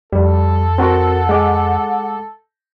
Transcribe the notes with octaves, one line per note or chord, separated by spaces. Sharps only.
F2 G3 A4
C4 F#4 A#4 F#5
G#3 D6